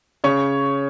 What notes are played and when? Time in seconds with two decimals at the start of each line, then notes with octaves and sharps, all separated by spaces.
0.24 C#3 C#5 C#6